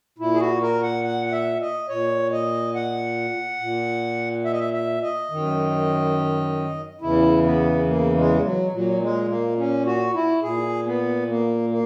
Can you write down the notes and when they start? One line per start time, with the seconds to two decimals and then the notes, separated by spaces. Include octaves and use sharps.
0.18 A#2 E4
0.34 G#4
0.40 F#4
0.62 A#4
0.82 F#5
1.04 F#5
1.25 F#5
1.32 E5
1.61 D#5
1.89 A#2 C#5
2.32 D#5
2.75 F#5
3.60 A#2
4.45 E5
4.52 D#5
4.59 E5
4.74 E5
5.02 D#5
5.30 F#2 D#3
7.01 E2 C#3 E3 E4
7.44 B3
7.86 A#3
8.16 G#3
8.44 F#3
8.72 A#2 F#3
9.01 G#3
9.29 A#3
9.58 C#4
9.86 F#4
10.14 E4
10.42 A#2 G#4
10.86 B3
11.27 A#3
11.70 A#3